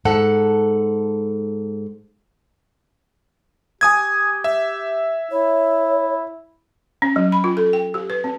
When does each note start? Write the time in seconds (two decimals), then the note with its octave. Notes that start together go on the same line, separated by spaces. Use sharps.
0.05 G#2 A4 F#5
3.81 G4 G#5 D#6 G#6
4.44 E5
5.31 E4 C#5
7.02 C#4
7.16 F#3
7.32 B5
7.44 F4
7.57 A4
7.73 G5
7.94 G4
8.10 B4
8.24 C4